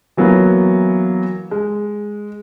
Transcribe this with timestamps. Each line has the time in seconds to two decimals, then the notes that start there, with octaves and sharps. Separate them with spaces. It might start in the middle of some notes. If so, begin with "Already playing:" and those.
0.17 E3 F#3 A#3 B3
1.51 G#3